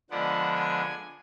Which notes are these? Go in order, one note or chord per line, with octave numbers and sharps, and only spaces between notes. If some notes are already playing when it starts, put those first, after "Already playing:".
D3 F3 G#3 B3 D4 F#5
G#5